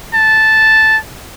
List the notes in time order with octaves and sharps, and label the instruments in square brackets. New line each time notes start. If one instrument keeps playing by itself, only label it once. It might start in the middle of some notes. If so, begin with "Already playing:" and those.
[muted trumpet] A5